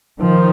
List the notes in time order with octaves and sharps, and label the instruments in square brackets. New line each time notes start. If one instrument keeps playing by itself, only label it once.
[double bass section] D#3 F3